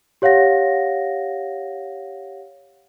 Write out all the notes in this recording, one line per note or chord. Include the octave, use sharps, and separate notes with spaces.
G4 C#5 F5 F#5 A#6